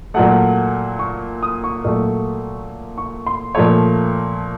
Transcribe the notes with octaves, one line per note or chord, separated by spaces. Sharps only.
A#2 F#3 A3 F#5
C#6
D#6
C#6
A#2 F#3 A3
C#6
C6
A#2 F3 A3 C#5